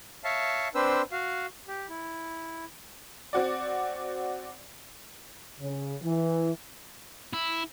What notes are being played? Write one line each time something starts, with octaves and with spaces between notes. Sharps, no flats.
C#5 E5 F5 A5
C4 D4 B4 C5 E6
F#4 F5
G4
E4
C4 F#4 D5
C#3
E3
E4